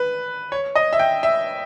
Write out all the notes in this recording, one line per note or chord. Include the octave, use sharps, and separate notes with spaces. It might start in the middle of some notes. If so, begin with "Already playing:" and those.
Already playing: B4
C#5
D#5
E5
G5
E5